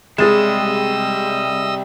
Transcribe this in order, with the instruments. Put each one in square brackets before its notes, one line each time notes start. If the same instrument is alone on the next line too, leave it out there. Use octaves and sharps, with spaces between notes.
[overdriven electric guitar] C3 G3 [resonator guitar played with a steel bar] G#3 [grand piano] G#4 A6 E7 [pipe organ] D#5 E6